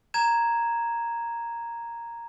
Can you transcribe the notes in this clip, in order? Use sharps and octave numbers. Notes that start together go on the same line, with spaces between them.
A#5 G#6 E7